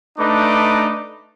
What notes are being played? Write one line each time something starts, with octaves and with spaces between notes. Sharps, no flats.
A3 D4 D#4 B4 D6